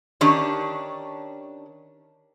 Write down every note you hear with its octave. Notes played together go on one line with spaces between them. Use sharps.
D#3 C#4 D4 G4